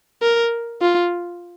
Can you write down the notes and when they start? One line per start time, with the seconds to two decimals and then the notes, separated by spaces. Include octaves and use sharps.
0.22 A#4
0.81 F4